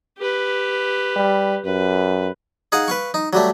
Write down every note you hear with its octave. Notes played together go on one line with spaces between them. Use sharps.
G4 B4
G3
F#2 B4
D#4 G#4 F5 F#5
B4 F5 C#6
D#4
F#3 G3 A3